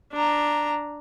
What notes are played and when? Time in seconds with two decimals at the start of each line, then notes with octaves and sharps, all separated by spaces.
0.13 D4 A#5